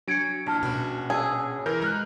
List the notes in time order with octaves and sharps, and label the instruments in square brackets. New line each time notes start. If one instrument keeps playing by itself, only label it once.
[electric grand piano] F#3 D7 [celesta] D4 G#6 C#7
[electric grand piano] A#1 [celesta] D4 A5 F6 [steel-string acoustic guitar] E4
[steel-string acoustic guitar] B2 C#4 F#4
[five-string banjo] G#4 [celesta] A5 E6
[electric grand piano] E3 A#4 G6
[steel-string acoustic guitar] G#3 [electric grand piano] A#5 F6 F#6